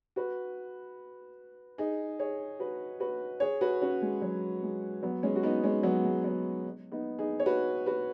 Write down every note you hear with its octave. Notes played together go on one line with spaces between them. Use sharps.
F#4 B4
D#4 G#4
G#4 C#5
F#4 B4
F#4 B4
G#4 C#5
F#4 B4
C#4 F#4
G#3
F#3
G#3
F#3 B3
G#3 C#4
F#4
B3 D#4
G#3 C#4
F#3 B3
G#3
F#3 B3
B3 D#4
D#4 G#4
C#5
F#4 B4
F#4 B4